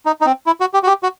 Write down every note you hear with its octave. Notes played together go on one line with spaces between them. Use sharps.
D#4
D#4
C4
E4
F#4
G4
F#4
G4
F#4